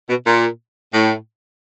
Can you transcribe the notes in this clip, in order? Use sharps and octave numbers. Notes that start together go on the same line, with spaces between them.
B2
A#2
A2